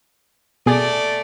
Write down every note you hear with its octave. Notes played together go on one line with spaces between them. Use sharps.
B2 A3 G#4 D5